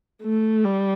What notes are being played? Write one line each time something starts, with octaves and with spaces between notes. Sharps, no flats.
A3
G3